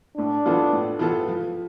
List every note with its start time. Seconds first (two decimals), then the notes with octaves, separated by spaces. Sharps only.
0.17 A2 D4
0.46 E3 B3 F4 A4
0.72 A2
0.99 E3 B3 F4 A4
1.28 F3